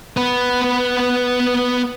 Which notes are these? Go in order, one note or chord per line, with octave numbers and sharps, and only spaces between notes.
B3 B4